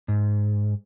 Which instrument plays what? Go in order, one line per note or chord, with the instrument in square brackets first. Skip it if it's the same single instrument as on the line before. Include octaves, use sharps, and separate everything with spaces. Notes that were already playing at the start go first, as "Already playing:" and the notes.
[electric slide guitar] G#2